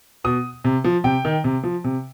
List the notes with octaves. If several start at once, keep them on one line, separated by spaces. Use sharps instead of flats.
B2 D#6
C3
F3
C3 G5
D#3
C3
F3
C3